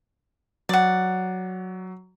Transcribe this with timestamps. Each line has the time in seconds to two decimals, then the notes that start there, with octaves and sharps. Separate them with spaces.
0.69 F#3 D5 F#5